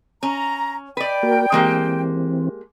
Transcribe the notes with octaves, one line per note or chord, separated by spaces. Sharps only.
C#4 A#5
B4 D5 G5
A#3 F#4 A#4
E3 G#3 A#3 C4 G4